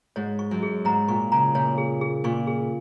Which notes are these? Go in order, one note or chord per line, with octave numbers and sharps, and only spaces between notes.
G#2 C#5
C#6
F#2
G#4
G#2 A#5
A#2 C#6
C#3 A#5
A#2 C#5
G#4
G#4
A#2 C#6
G#4